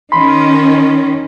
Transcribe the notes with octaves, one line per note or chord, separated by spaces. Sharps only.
D#3 C#4 B5 C6